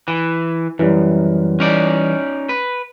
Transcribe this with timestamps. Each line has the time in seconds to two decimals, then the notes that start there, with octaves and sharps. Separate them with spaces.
0.08 E3
0.79 F#2 E3 G3
1.60 C#4 D#4 D5
2.49 B4